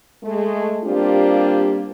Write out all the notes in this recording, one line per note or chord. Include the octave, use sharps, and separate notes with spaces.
G#3 A3
G3 A#3 C4 D4 F4 G4